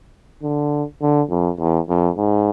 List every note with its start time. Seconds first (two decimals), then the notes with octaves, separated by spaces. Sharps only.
0.43 D3
1.02 D3
1.30 F2
1.59 E2
1.89 F2
2.17 G#2